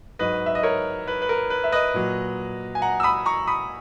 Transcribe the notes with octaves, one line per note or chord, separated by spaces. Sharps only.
G#2 F#3 B4 D#5
E5
D#5
A#4 C#5
B4
B4
A#4
B4
E5
B4 D#5
A#2 F#3
G#5
F#5 A#5
E6
B5 D#6
A#5 C#6
B5 D#6